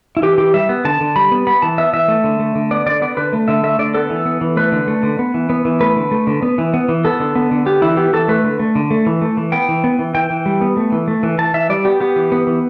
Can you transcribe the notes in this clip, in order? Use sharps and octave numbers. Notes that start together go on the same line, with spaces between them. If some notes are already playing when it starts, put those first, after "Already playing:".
E4
E3 G4
E3 G4
G3 E5
B3
D3 A5
D3
G3 B5
B3
B3 B5
E3 A5
B3 E5
E3 E5
A3
D3
A3
D3
B3 D5
D3 D5
B3 D5
D3 B4
A3
D3 E5
A3 E5
D3 D5
B3 A4
E3
B3
E3
A3 B4
D3
A3
D3
B3
E3
B3
E3
A3 B4
D3
A3
D3
B3
E3
B3
E3
B3 A4
D3
B3
D3
B3 G4
E3 E4
B3 G4
E3 A4
A3 B4
D3
A3
D3
A3
E3
A3
E3
B3 G5
E3
B3
E3
E3 G5
E3
G3
B3
A3
E3
A3
E3
E3 A5
E3 E5
G3 D5
B3 G4
B3 G4
E3
B3
E3